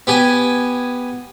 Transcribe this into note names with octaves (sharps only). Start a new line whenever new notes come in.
B3 G4 G#5